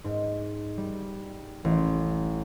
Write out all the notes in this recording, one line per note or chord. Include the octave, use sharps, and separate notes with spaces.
G#2
G3
A1